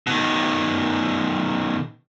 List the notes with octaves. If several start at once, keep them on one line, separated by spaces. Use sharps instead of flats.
B2 D#3